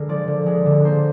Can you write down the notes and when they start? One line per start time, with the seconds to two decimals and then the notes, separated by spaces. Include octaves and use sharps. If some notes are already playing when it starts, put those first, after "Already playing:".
Already playing: D3 G#3 A#4
0.09 F3 D5
0.27 D3
0.46 G#3
0.66 D3
0.85 A#3 C5